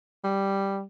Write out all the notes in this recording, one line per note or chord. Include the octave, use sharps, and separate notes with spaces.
G3